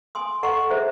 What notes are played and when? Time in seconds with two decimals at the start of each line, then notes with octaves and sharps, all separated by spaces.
0.15 G#5 C6 D#6
0.43 A4 D#5 F#5 A#5 C#6
0.70 G#4 C5 E5